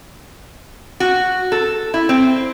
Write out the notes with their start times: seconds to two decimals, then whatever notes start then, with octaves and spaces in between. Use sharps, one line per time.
1.00 F#4
1.52 A4
1.94 E4
2.09 C4